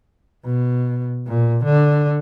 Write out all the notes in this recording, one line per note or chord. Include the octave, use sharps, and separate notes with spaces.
B2
A#2
D3